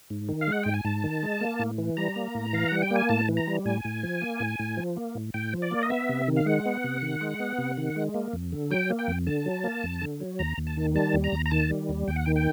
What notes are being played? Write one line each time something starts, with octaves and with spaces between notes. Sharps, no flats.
G#2
D#3
F5
G#3 F#5
G#2 G5
G#5
G#2 A5
D#3
G#3
A#3
A2
E3
G3 A#5
A#3
A2
E3 F5
G3 F#5
G5
A#3
G#5
A2 A5
E3
A#5
G3
A2 G#5
A2
F3
A#3
A2
A2
F3
A#3
A2
A2 G5
F3
D5
A#3
D#5
B3 E5
C3
D#3
F5
G#3 F#5
B3
C3
D#3
G#3
B3
C3
D#3
G#3
A#3
F2
D3
F#3 G5
A#3
G5
F2
D3 A5
F#3
A#3
F2
D3
F#3
D#2 A#5
D#2
A5
D#3
G3 A5
D#2
A#5
D#2
A#5
D#3 A5
G3
D#2
D#2 G5
F#5
D#3 G5
G5